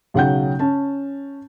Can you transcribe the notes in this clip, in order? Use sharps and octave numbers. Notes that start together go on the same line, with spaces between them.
B1 C#3 F#3 F#5 G5 G6
C#4 A5